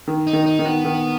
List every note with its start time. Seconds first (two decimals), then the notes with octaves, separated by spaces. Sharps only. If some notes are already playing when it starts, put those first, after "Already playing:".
0.07 D#3
0.27 D#4
0.33 D#3
0.46 D#4
0.59 D#3
0.65 B3
0.85 D#3